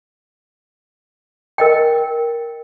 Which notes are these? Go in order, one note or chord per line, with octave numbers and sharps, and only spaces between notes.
A#4 D#5 G5